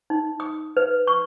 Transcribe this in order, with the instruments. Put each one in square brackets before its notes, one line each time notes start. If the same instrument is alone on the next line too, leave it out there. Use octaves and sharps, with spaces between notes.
[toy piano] D#4
D#6
B4
C#6